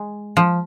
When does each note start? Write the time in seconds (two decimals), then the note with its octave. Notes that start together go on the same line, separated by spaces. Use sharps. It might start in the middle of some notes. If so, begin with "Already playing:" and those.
Already playing: G#3
0.37 F3